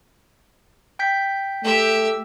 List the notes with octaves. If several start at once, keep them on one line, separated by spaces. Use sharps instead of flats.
G5 G6 B6
A3 G4 E5